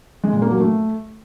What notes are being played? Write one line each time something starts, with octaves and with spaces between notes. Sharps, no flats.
G#3
A#2
A#3
F#3
A3